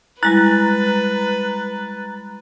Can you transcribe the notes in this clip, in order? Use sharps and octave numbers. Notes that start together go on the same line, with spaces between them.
G3 G#3 E4 B4 A#5 F#6 A6